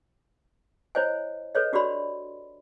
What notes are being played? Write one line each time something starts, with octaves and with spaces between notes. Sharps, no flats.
E4 C5 C#5 D#5 G#5
A4 B4 C#5 D#5
D4 F#4 G4 D5 B5 C6